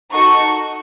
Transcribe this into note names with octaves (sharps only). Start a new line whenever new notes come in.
D#4 F#4 A4 C#6